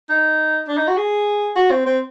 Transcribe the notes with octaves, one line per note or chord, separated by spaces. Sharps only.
D#4
D4
D#4
F#4
G#4
F#4
C4
C4